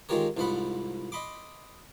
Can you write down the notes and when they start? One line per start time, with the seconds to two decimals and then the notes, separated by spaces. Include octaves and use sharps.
0.09 D#3 G#3 F4 G4 A#4 C#5
0.37 C2 G#2 F3 C5 F#5 B5
1.12 D#5 B5 C6 D6